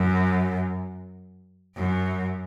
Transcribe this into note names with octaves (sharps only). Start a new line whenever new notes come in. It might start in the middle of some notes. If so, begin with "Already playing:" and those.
Already playing: F#2
F#2